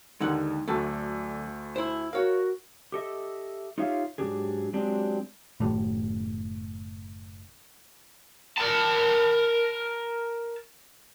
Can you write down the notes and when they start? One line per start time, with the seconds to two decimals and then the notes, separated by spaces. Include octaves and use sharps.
0.20 D#2 D3 G#3 D#4 F#5
0.68 D2 D3 F#3 A3 A5
1.76 E4 C5
2.13 F#4 A#4 C#5 F5
2.92 G4 A4 D#5 E5
3.78 D#4 F4 G4 C#5 E5 F5
4.18 G#2 C#3 F#3 D4 G4 G#4
4.73 F#3 G#3 C4 D4 G4
5.60 F#1 A2
8.58 A#4 A5